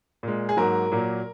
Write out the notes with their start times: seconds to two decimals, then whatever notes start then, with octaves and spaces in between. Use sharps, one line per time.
0.23 A#2 G#3
0.49 G#4
0.57 G#2 F#3 A#3 A#4
0.92 A#2 F#3 A#3